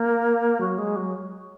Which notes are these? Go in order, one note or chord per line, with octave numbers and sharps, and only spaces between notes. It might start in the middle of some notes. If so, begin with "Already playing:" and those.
Already playing: A#3
F#3
G#3
F#3